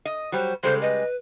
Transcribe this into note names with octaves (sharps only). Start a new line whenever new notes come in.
D#5
F#3 G3 C5
C#3 G3 G#3 A4 C5
B4 D#5